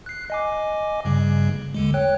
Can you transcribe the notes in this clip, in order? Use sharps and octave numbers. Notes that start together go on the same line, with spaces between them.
F#6 C7
D#5 G#5 D6
G2 C#3 G3
D#2 D3 G#3
C#5 G5 F#6